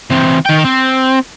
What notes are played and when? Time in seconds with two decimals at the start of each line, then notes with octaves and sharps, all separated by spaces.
0.10 E3 C4
0.46 D#3 G5
0.65 C4